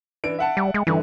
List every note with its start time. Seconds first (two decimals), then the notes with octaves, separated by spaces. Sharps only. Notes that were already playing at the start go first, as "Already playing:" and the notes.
0.24 E3 D4 D7
0.39 E5 F#5 A5
0.57 G3
0.74 G#3
0.87 G2 D3 E3